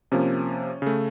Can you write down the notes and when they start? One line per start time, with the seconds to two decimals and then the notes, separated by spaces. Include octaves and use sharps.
0.12 C3 F3 A#3 C#4
0.82 C#3 A3